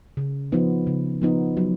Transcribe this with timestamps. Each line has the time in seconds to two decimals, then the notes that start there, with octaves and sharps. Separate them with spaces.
0.17 C#3
0.52 F3 B3 D#4
0.87 C#3
1.22 F3 B3 D#4
1.57 F#3